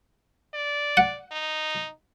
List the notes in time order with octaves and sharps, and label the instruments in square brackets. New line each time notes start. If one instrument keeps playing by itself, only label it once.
[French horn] D5
[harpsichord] F#5
[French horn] D#4